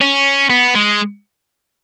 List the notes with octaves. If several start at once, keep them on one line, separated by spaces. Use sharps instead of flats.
C#4
B3
G#3